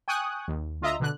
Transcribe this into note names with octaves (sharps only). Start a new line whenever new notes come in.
G5 G#5 C#6 D#6 F#6
D#2
D2 F4 D#5 E5 A#5
B2 D3 F#6